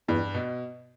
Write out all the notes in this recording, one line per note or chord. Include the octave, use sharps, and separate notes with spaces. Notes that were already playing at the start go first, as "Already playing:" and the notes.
E2 G2
B2